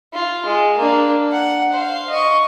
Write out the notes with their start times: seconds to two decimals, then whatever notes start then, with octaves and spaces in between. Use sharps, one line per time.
0.13 F4
0.46 G#3
0.78 A#3 D4
1.32 F#5
1.73 C5 F5
2.10 D#5 C#6